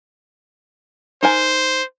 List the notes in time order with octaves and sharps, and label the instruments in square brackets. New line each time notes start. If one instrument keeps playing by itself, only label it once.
[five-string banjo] D#4 A#4 G#5 [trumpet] C5